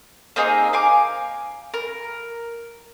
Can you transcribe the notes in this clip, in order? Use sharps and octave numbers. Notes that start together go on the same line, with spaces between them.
A#3 C4 D#4 G#4
F5 G#5 D6
A#4